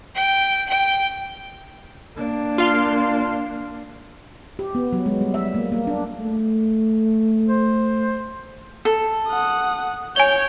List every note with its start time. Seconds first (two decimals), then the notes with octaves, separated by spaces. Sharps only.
0.15 G5
0.70 G5
2.16 A#3 D4
2.58 F4 F5 C6
4.59 G4
4.75 B3
4.93 F#3
5.06 G#3
5.21 G3
5.34 E5
5.54 A#3
5.72 A#3
5.87 D4
6.19 A3
7.48 C5
8.85 A4
9.28 F#5 D#6
10.16 C#5 G#5 G6 G7